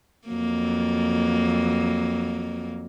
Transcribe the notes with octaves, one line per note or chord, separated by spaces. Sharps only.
F2 F#3 A#3